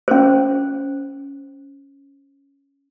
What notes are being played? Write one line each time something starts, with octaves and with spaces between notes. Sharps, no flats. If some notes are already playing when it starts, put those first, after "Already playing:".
C#4 C5